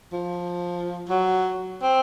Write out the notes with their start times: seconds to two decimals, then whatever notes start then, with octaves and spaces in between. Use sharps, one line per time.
0.13 F3
1.09 F#3
1.82 C4